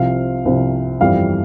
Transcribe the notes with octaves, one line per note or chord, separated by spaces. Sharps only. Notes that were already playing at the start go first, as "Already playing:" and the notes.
Already playing: C2 C3 F3 C4 F5
C2 C3 F3 C4
G1 F2 E3 G3 C4 F5